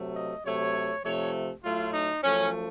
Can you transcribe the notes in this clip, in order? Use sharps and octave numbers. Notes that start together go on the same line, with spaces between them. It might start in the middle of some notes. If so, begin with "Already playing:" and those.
Already playing: C3 F#3 A3
D#5
C3 F#3 A3 C#5
C3 F3 A3 C#5
A2 F#3 A3 F4
D#4
F#2 F3 A3 C#4